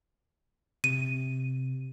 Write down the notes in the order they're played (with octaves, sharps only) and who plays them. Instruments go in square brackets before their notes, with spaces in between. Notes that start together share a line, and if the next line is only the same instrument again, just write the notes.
[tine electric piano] C3 [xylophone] D#7